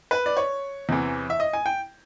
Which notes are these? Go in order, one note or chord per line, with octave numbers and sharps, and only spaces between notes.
B4
D5
C#5
E2 C3 E3
E5
D#5
G#5
G5